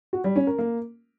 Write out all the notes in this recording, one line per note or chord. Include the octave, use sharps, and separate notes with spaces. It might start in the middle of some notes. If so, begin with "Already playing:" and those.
F#4
G3
C#4
A#4
A#3